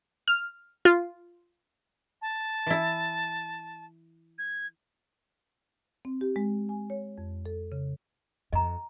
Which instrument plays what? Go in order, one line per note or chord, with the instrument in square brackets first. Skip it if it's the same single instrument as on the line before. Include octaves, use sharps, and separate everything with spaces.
[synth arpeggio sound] F6
F4
[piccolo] A5
[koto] E3 E4
[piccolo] G#6
[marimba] C4
G4
G#3
G#5
C#5
F2
A4
C#3
[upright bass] F2 [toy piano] D#5 A#5